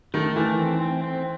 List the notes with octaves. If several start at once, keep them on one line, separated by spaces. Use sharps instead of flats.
D#3 A3
E3 A3
C4
C4
C4